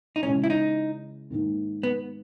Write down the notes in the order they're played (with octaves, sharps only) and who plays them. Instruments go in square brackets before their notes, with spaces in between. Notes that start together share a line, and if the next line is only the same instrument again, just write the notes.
[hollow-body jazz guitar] D#4
[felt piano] C#3 E3 G#3 [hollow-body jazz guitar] C#4
[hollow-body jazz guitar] E4
D#4
[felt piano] G#2 D#3 A#3 D#4
[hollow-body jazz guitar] B3